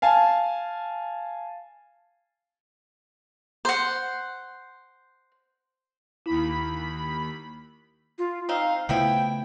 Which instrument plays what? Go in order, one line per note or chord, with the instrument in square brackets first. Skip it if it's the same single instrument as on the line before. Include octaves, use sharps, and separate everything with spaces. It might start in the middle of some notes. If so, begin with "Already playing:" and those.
[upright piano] F5 G#5 A5
[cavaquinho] C5 F#5
[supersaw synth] D#2 B5 [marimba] E4
[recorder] F4
[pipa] C4 D#4 [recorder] F5
[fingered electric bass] C#3 A3 [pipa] F3 B3 E4 [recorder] G5